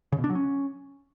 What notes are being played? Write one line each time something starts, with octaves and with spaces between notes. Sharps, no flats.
C#3
B2
D4
F#3
C#4